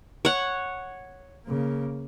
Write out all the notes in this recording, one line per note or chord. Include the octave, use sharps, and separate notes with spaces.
C#5 F#5
C#3 A#3